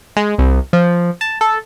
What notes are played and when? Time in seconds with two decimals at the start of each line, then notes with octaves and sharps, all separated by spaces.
0.17 G#3
0.38 C2
0.73 F3
1.21 A5
1.41 A4